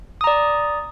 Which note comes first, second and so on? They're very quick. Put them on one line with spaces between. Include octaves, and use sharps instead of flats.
D#6 A#5 D5